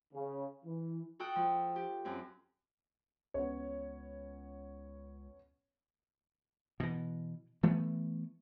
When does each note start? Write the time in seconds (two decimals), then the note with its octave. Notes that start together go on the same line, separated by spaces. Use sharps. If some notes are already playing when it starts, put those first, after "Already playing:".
0.14 C#3
0.65 E3
1.20 F#4 A4 G5 D#6 F#6
1.36 F3
1.76 G4
2.05 F#2 C4
3.34 C#2 B3 C#4 C#5
6.80 B2 E3
7.63 E3 A3 B3